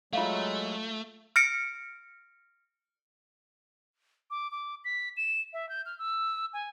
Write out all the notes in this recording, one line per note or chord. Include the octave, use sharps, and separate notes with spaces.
F#3 G#3 A3 F4 E5 F5
F6 A#6 C#7 D7
D6
D6
B6
E7
E5
G6
F6
E6
G#5